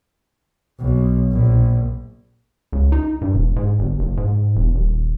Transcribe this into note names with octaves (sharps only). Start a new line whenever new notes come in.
B1
A#1
C#2
D#4
G2
E1
G#2
G1
F#1
G#2
E1
D#1